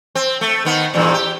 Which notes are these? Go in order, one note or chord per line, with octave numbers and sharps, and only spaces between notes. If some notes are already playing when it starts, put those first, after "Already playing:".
C4
A3
D#3 B3
E2 G2 A#2
G4